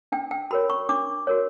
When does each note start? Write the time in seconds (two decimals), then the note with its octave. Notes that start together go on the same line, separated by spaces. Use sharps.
0.12 D4 G5
0.31 G5
0.51 F#4 A#4 C#5 B5
0.70 C#6
0.89 D4 D6
1.27 F#4 A#4 C#5